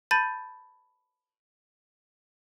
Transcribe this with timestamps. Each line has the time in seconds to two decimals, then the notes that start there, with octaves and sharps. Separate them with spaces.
0.11 A5 B5 G6 A6 D#7